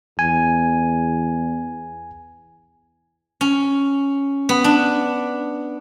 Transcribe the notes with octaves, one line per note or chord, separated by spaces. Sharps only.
E2 G#5
C#4
B3
D4